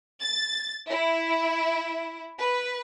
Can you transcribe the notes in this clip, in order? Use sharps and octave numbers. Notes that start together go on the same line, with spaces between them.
A6
E4
B4